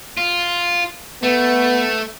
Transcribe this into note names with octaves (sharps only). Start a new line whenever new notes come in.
F4
A3 B3